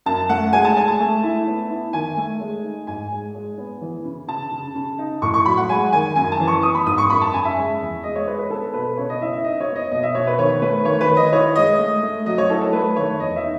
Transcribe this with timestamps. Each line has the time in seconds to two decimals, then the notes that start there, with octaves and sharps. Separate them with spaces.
0.06 F#2 A5
0.29 A3 F#5
0.53 G#3 G#5
0.65 A5
0.76 G#3 G#5
0.88 A5
1.00 A3
1.24 E4
1.47 B3
1.70 E4
1.93 D#3 G#5
2.17 A3
2.40 G#3
2.64 D#4
2.87 G#2 G#5
3.12 G#3
3.35 G#3
3.57 B3
3.81 E3
4.05 C#3
4.28 C#3 A5
4.52 C#3
4.75 C#3
4.99 D#4
5.22 A2 C#6
5.34 C#6
5.46 F#3 B5
5.57 F#5
5.69 G#3 G#5
5.93 D#3 G#5
6.15 F#2 G#5
6.32 A5
6.40 E3
6.48 C#6
6.63 B3 D#6
6.75 B5
6.86 G#2 D#6
6.98 C#6
7.10 F#2 B5
7.22 A5
7.33 C#3 G#5
7.45 E5
7.57 G#3
7.80 E2
8.03 G#3 D#5
8.15 C#5
8.27 G#3 B4
8.39 B4
8.50 B3 A4
8.74 B2 B4
8.97 C#3 C#5
9.09 D#5
9.21 E4 E5
9.33 E5
9.44 D#4 D#5
9.60 C#5
9.68 B3
9.76 D#5
9.91 B2 D#5
10.03 E5
10.15 B2 C#5
10.27 B4
10.38 D#3 C#5
10.62 A3 B4
10.85 D#3 C#5
11.01 B4
11.09 D#3
11.17 D#5
11.32 E4 C#5
11.56 G#3 D#5
11.79 A3
12.03 A3
12.26 F#3 D#5
12.38 C#5
12.50 E4 A4
12.61 A4
12.73 A3 B4
12.96 D#3 C#5
13.20 E2 D#5
13.36 E5
13.43 D#4